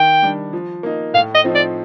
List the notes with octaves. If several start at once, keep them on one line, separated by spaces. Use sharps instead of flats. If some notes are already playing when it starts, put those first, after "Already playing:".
Already playing: D#3 G5
G3 D4
F3
A#3 D#4
A2 F5
D#5
F3 C4 D#4
D5